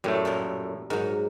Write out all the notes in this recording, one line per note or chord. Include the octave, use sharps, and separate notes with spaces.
F#2 A2 G3 A3
A#2 B3 A#4
G#2 F#3 A#4